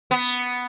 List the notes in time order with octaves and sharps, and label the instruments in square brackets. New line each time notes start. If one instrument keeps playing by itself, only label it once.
[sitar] B3